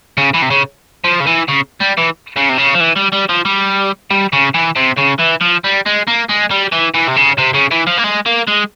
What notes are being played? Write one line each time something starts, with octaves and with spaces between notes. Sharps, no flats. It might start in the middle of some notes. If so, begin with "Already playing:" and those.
C#3
E3
C3
C#3
F3
C#3
E3
C#3
G3
E3
C#3
C3
C#3
F3
E3
G3
G3
F3
G3
G3
C#3
E3
C3
C#3
E3
F3
G3
G#3
A#3
G#3
G3
E3
E3
C3
C#3
C3
C#3
E3
F3
A#3
G#3
A#3
G#3